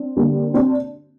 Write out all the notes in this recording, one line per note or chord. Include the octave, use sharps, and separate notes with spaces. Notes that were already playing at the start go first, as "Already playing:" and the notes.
Already playing: C4 D4
D3 G3 A#3
C4 D4